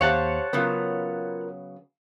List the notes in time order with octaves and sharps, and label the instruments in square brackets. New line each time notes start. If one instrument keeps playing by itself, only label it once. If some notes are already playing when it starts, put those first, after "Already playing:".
[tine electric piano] D#2 [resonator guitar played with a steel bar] G4 C5 F5 [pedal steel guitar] C#5 F#5 A5
[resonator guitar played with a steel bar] C#3 F#3 B3 [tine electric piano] F4 A#4 B4